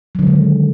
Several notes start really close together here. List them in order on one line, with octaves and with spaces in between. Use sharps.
F#3 D3 G#3 D#3